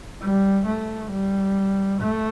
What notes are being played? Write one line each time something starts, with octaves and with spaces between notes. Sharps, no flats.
G3
A3
G3
A3